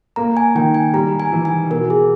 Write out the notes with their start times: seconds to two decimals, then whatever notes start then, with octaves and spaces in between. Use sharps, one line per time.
0.16 A#3 A#5
0.37 G#5
0.55 D#3 G5
0.74 G#5
0.94 G3 A#5
1.20 G#5
1.32 E3
1.45 G#5
1.70 B2 A#4
1.90 G#4